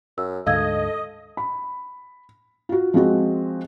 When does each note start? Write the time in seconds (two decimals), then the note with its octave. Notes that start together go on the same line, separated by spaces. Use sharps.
0.18 F#2 E6
0.46 D2 G#2 D3 A4 D#5 F5 E6 G#6
1.37 B5
2.69 F4 F#4
2.94 F3 G#3 C4 F#4